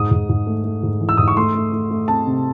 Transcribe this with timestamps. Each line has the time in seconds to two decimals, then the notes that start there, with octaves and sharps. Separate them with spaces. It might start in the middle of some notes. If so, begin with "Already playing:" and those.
Already playing: G#2 D#6
0.11 G#2
0.29 G#2
0.47 A3
0.64 A3
0.83 G#2
1.00 E3
1.09 E6
1.17 G#2 D#6
1.28 C#6
1.37 A3 C6
1.55 A3
1.72 A3
1.91 A3
2.08 C4 A5
2.27 C3